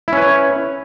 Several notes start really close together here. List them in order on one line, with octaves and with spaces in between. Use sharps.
E4 C#4 B4 C#5